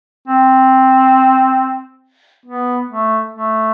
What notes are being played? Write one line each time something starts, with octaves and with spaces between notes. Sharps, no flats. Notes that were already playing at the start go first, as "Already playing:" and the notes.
C4
B3
A3
A3